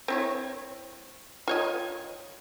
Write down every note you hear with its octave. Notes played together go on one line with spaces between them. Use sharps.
C4 E4 C#5
F4 C#5 D#5